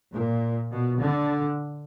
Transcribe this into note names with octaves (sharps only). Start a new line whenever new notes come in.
A#2
B2
D3